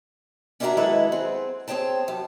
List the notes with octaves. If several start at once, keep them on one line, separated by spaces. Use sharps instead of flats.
C#4 D4 E4 F#4 E5 A#5
D#3 F#3 G#3 E4 A4 B4
C4 G#4 F#5
C4 G#4 C#5 G5 A5
F#2 A5